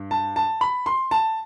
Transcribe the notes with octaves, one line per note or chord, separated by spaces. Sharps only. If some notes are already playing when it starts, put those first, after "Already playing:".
Already playing: G2
A5
A5
B5
C6
A5